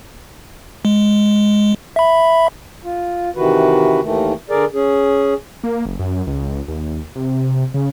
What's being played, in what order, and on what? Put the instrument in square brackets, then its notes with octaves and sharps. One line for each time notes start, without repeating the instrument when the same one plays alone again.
[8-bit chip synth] G#3
E5 B5
[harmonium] F4
C3 D#3 E3 F#4 B4
D#2 D#3 E3 A3
D3 G#4 A#4 D5
C#4 G#4
[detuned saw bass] A#3
F#1
F#2
C#2
D#2
C3
C#3